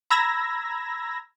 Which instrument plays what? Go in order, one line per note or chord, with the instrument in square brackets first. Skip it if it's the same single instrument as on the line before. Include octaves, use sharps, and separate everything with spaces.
[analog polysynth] A#5 B5 E6 G#6 A#6